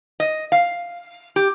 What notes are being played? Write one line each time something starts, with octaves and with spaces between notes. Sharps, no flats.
D#5
F5
G4